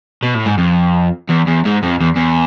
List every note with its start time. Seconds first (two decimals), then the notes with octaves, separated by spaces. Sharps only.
0.23 B2
0.34 A2
0.46 G#2
0.58 F2
1.29 E2
1.47 E2
1.65 G#2
1.83 F2
2.00 E2
2.16 E2